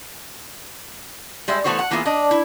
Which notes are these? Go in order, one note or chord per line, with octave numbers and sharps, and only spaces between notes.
G3 G#3 C5 E5
E3 A3 B3 F#4 C5 C#5
F#5
E3 A#3 B3 F4 G#4 E5
D4 D#5
E4